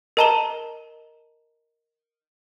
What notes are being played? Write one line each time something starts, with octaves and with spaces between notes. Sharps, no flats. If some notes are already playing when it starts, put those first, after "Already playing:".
A#4 D#5 A5 A#5 E7 G7